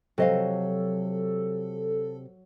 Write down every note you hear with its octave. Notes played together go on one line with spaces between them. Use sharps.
C3 F#3 A4 D#5 F5